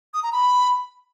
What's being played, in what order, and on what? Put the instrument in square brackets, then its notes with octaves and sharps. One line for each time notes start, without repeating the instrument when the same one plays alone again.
[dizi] D#6
A#5
B5